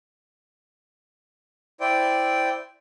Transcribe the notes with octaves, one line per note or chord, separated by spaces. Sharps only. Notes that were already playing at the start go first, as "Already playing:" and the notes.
E4 C5 D5 G5